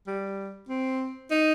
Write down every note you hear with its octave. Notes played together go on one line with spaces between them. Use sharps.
G3
C4
D#4